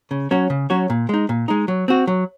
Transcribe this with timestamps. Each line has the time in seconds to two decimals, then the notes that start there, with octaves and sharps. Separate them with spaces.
0.11 C#3
0.31 F#3 C#4 F#4 C#5
0.50 C#3
0.70 F#3 C#4 F#4 C#5
0.90 A#2
1.09 G#3 D#4
1.29 A#2
1.48 G#3 D#4
1.68 F#3
1.88 C4 F#4
2.07 F#3